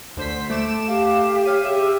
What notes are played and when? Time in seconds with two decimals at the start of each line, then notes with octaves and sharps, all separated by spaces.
0.17 D2 C5 B6
0.50 A3 D6 E7
0.88 G4 F5
1.45 C#5 F5 D#7
1.65 G4 G#4 E5